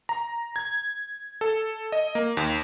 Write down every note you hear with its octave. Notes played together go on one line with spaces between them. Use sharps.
A#5
G#6
A4
D#5
A#3
D#2